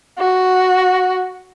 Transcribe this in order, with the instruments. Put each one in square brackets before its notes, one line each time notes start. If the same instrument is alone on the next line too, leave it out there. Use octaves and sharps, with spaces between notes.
[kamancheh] F#4